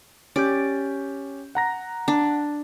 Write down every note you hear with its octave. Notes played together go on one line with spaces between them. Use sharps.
C#4 G4 D5 G6
F#5 A#5 A#6
D4